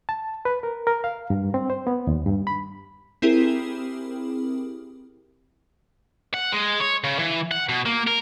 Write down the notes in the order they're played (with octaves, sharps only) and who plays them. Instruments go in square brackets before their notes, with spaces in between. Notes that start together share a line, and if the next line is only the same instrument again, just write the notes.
[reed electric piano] A5
B4
A#4
A#4
F5
G2
C4
C5
B3
D#2
G2
B5
[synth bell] C4 E4 G4 G#4 A#4
[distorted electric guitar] F#5
G#3
C#5
C#3
E3
F#5
B2
A#3
A#4